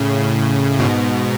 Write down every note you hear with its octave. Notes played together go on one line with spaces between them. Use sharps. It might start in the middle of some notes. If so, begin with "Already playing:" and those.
Already playing: A2 C#3
G#2 B2